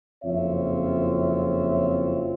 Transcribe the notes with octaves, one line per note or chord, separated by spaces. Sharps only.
F#1 F2 C4 F4 C#5 E5